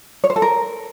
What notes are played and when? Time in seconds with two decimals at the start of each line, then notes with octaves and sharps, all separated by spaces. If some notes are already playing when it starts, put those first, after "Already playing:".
0.24 C#5
0.30 C5
0.36 A4
0.42 A#4